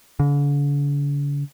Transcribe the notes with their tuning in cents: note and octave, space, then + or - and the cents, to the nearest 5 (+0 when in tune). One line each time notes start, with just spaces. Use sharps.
D3 -45